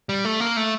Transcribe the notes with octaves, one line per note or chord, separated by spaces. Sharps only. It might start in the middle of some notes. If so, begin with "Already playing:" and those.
G3
A3
A#3
A3